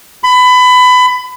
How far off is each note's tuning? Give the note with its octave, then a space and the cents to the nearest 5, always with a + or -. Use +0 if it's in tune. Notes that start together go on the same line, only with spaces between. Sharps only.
B5 +25